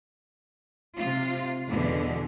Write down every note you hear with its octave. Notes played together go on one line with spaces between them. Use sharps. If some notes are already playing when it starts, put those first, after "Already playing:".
C3 F4
E2 B2 D3 E3